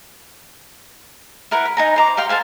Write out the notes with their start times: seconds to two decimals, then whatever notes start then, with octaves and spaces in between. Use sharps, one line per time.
1.51 E4 A#4 B4 F#5
1.65 B5
1.77 D#4 G#5 A#5
1.96 C5 A#5 D6
2.17 G4 F5 G5 C6
2.29 A4 C5 F5 G#5